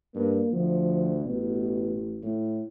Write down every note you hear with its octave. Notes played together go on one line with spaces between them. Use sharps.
G2 A#3
D2 F3
A1 B2
A2